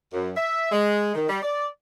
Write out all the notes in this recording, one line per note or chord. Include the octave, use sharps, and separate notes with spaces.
F#2
E5
G#3
D#3
G3
D5